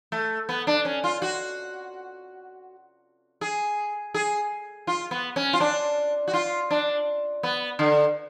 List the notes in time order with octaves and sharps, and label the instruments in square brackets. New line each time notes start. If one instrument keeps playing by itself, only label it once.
[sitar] A3
B3
D4
C#4
F4
F#4
G#4
G#4
F4
B3
C#4
F4
D4
F#4
F4
D4
B3
D3